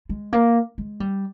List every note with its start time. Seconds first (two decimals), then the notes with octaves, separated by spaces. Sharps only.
0.09 G#3
0.33 A#3
0.78 G#3
1.00 G3